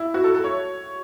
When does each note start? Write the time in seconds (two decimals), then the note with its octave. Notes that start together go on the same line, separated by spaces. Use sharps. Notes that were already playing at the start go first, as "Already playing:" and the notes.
Already playing: E4
0.14 F#4
0.24 A4
0.34 A4
0.44 C#5